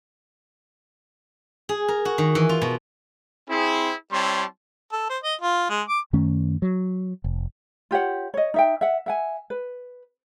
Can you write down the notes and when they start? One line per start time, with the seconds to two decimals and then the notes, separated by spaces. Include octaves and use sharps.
1.69 G#4
1.88 A#4
2.05 F#4
2.18 D#3
2.35 E3
2.49 F4
2.62 B2
3.49 C4 E4 G#4
4.12 G3 C4 E4 C#5 A5 C6
4.92 A4
5.09 C5
5.24 D#5
5.41 F4
5.70 G#3
5.88 D6
6.13 F#2 D#3 A3 C#4
6.62 F#3
7.24 F1
7.91 F4 G4 C#5 F#5
8.34 C#5 D#5
8.54 D#4 E5 G5
8.81 E5 F#5
9.06 E5 F#5 G#5
9.50 B4